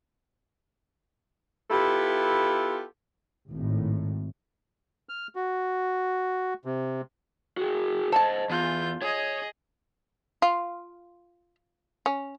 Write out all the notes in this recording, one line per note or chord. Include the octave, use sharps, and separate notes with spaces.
B3 E4 F4 G4 A4
G#1 A2
F6
F#4
C3
F#4 G#4
A4 C5 D#5 A5
E2 F4 G6
G#4 C#5 D#5
F4
C#4